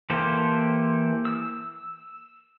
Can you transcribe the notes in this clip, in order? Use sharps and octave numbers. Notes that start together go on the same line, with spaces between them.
E3 A#3 G4 A4 C5
E6